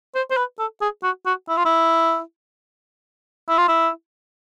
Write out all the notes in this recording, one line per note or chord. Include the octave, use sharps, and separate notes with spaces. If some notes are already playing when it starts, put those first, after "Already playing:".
C5
C5
B4
A4
G#4
F#4
F#4
E4
F4
E4
E4
F4
E4